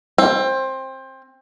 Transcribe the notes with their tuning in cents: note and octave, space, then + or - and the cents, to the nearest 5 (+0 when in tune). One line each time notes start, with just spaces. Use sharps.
C4 +20